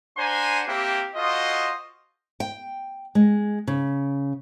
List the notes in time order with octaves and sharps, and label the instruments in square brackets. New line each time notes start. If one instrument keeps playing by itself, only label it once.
[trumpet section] D4 C5 F#5 G#5 A#5 C6
A#3 C4 E4 G4
F4 F#4 A4 C5 D#5
[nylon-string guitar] G5
G#3
C#3